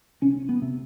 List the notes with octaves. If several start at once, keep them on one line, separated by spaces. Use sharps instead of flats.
C3 C#4
B3
C3